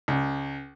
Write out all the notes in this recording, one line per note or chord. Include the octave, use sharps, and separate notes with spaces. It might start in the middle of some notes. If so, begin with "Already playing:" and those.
C#2